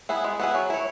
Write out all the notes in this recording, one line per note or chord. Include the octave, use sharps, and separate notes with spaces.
B3 E4 G#4
G#3
B3 E4 G#4
F#3
E4 C#5